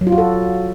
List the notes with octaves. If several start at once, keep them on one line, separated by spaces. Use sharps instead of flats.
F#3
F4
F#4
A4